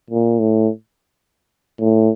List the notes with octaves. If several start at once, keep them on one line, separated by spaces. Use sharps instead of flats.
A#2
A2
A2